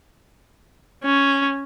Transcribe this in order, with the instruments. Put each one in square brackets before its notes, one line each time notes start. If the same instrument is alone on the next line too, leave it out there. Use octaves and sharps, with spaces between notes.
[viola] C#4